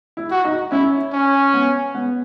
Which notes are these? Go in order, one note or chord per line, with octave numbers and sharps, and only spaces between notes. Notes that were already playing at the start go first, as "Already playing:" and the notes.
E4
F#4
D#4
C#4 E4
C#4
B3
B3